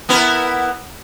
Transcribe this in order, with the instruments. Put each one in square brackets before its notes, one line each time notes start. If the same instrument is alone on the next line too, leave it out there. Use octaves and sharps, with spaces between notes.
[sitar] B3 E4 A#4